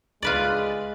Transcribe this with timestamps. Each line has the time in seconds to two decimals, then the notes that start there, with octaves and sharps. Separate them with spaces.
0.22 C#2 G#3 F4 B4 D5